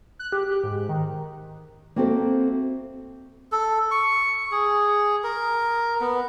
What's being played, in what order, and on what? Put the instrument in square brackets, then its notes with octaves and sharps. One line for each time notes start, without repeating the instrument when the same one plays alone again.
[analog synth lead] F#6
G4
G4
G#2
D#3
[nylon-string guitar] A#3 C4 F#4 A4 C5 E5
[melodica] A4
C#6
G#4
A#4
B3